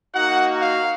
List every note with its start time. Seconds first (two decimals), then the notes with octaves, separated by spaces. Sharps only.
0.14 A#3 D#4 F#4 F#5
0.61 F5